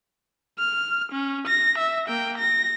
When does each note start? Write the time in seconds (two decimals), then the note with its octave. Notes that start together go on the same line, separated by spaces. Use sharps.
0.58 F6
1.12 C#4
1.48 A#6
1.78 E5
2.08 A#3 G5
2.38 A#6